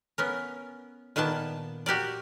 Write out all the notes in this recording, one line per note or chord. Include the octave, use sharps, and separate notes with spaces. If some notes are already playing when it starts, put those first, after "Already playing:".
B3 C#4 A#4
A#2 D#3 A#3 B3 A5
F#4 G4 A#4 D5